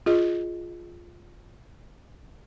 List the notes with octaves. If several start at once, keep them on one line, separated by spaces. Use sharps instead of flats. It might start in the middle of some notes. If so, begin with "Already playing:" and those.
F4 G#4 D#5